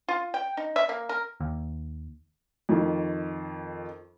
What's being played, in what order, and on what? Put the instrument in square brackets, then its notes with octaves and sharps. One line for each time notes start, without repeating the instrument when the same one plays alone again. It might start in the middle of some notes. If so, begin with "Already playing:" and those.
[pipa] F4
G5
D#4
E5
A#3
A#4
[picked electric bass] D#2
[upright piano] F2 D#3